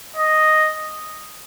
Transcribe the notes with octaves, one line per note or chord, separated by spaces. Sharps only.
D#5